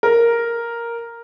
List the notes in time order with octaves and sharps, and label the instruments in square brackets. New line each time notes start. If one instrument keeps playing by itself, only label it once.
[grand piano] A#4